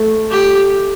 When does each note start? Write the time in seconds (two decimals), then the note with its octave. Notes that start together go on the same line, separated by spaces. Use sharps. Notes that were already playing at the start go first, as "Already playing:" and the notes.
Already playing: A3
0.30 G4